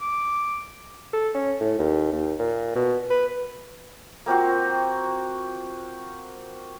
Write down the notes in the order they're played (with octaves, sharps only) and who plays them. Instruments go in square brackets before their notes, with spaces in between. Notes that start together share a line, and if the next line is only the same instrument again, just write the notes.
[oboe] D6
[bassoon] A4
C#4
A2
D#2
D#2
A#2
B2
B4
[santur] A#3 C4 F4 F#4